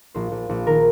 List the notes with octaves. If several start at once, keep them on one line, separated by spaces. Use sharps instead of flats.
A#1 C5
A#1
A#1
D#3 A#4